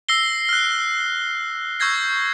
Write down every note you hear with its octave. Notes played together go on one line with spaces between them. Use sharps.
E6 A#6 C7 G7
F6 F#6
C#6 E6 G6 G#6 A#6 C7